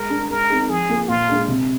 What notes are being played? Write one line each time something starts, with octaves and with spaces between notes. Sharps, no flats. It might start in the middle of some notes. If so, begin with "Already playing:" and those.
Already playing: G#3 A#4
D4 G#4
G#3 A#4
C4 D#4 G#4
F3 G#4
A#3 F4 A#4
A#2 F4
G#3 D4 G#4
C3